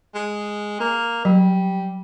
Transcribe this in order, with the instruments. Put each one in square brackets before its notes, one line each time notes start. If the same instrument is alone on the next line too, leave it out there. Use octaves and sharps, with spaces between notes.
[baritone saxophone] G#3
A#3
[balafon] F#3 [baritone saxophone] G3